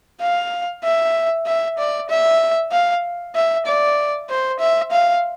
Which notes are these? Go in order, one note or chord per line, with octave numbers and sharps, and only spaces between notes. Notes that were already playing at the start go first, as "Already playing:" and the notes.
F5
E5
E5
D5
E5
F5
E5
D5
C5
E5
F5